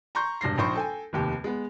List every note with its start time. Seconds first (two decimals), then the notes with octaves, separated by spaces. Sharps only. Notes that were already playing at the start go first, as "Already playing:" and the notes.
0.15 A#5 C6 C#6 G6
0.41 E1 G2 A#6 C7
0.58 A#1 D#4 C5 B5 C#6
0.75 A4 G5 G#5
1.13 F1 D#2 G4
1.44 G#3 B3